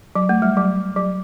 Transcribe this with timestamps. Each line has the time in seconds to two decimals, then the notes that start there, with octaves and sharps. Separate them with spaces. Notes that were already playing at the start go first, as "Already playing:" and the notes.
0.15 F#3
0.29 A3
0.42 G3
0.57 F#3
0.96 F#3